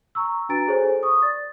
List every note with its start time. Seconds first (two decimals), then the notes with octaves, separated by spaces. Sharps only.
0.15 A#5 C#6 E6
0.49 D4 F#4 B4 A#5 A6 D7
0.68 G#4 A4 C5 C#5 G#5
1.03 C#6 D#6
1.22 D5 A6